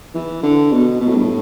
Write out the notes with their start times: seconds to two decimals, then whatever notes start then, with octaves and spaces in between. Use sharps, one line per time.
0.14 E3
0.43 D3
0.72 B2
1.00 B2
1.08 A2
1.15 G2
1.22 A2